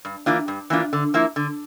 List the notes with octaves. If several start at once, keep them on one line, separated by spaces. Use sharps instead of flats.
G2
E3 A#3 D4 F4
G2
E3 A#3 D4 F4
D3
F3 A#3 E4
D3